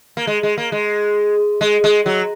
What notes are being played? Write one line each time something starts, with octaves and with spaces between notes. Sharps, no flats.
A#3
G#3
G#3
A#3
G#3
G#3
G#3
F#3